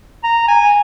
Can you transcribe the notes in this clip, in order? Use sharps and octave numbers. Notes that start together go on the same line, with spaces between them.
A#5
G#5